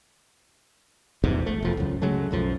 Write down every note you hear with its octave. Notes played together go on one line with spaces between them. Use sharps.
A#1 E2 G#2 C3
A3
E1 F3
C#2 F#2
C#3 F#3 G#3 A3
B1 F#2 F3